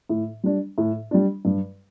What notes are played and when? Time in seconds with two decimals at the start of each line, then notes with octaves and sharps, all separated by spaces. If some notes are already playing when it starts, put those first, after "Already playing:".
0.09 A2
0.44 G3 D4
0.78 A2
1.11 G3 D4
1.45 G2